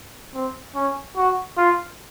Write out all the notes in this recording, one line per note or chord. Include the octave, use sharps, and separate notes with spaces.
C4
C#4
F#4
F4